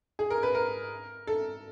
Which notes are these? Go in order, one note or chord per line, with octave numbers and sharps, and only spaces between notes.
G#4
A#4
B4
A#4
A4